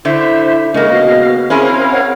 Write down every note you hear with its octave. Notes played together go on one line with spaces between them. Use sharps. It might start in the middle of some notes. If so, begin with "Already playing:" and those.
D3 E4 C5 E5
C#3 G#3 A#3 A#4 D#5
B3 F#4 F5
C4 C#4 E4 G#4 A#4 F5 B5 C6
C#5 F#5